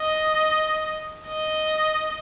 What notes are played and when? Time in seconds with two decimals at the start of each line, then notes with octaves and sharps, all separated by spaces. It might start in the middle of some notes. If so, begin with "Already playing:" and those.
Already playing: D#5
1.28 D#5